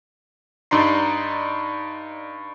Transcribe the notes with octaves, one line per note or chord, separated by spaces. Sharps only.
G2 D#4 D5 A#5 C6 C7